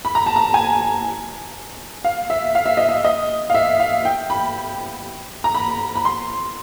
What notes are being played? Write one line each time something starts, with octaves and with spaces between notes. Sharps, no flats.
B5
A#5
A5
A#5
G#5
F5
E5
F5
E5
D#5
E5
D#5
F5
E5
F5
G5
B5
A#5
B5
B5
C6